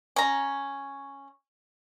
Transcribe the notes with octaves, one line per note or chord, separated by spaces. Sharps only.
C#4 A#5